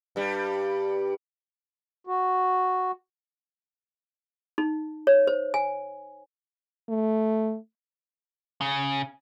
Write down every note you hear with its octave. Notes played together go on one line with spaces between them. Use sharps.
G2 G3
F#4
D#4
C#5
C5
G#5
A3
C#3